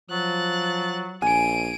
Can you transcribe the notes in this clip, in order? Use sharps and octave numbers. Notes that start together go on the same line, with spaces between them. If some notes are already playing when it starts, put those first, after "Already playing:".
F3 F#3 F#6 A6
A#1 G#5 D7 D#7